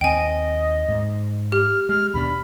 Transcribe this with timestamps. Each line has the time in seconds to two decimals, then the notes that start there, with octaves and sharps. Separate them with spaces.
0.01 D#2 C4 D#5 G5 G#5
0.89 G#2
1.52 G4 F6
1.89 G#3 F6
2.14 D#2 B2 D4 B5